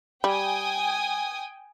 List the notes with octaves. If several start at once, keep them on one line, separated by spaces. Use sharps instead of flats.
G3 G5 G#5 D#6